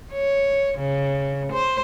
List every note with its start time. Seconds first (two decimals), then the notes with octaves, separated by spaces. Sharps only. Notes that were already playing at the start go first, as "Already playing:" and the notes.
0.13 C#5
0.79 C#3
1.52 C5